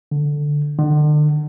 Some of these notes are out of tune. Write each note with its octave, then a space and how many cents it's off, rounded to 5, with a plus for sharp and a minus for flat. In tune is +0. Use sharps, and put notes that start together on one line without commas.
D3 +0
D3 +40